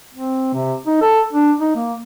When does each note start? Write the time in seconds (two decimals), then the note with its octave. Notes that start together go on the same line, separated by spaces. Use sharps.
0.15 C4
0.54 C3
0.87 D#4
1.02 A4
1.33 D4
1.60 D#4
1.76 A#3